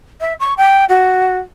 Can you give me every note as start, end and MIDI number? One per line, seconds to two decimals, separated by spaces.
0.21 0.33 76
0.40 0.54 85
0.57 0.84 79
0.89 1.37 66